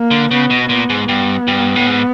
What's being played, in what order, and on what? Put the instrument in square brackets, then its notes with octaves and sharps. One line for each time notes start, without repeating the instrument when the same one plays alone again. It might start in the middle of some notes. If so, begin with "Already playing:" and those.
Already playing: [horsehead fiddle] A#3
[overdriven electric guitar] D3
[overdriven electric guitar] C#3 [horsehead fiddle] B3
[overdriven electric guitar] B2
[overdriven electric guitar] A#2 [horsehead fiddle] B3
[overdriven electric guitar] G#2
[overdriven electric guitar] G2 [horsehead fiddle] B3
[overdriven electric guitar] G2
A2
G#2